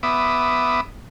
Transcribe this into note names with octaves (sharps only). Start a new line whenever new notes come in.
B3 E5 D6 D#6